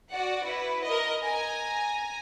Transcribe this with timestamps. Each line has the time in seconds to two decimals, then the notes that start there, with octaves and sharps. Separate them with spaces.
0.10 F#4 D5 F#5
0.45 E4 B4
0.84 A#4 D#5
1.24 G#5 A#5